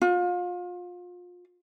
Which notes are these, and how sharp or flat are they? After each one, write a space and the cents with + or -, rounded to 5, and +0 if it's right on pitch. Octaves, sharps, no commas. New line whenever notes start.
F4 +30